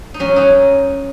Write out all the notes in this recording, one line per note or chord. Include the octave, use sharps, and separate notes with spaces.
D#4
F#3 C#4
F#3 D#4